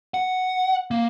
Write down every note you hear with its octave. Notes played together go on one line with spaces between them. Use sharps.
F#5
A#3